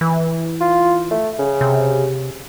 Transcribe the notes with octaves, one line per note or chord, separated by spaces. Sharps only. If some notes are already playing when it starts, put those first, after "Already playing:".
E3
F4
A3
C#3
C3